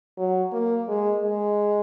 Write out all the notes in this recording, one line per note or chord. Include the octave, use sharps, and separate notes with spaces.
F#3
A#3
G#3
G#3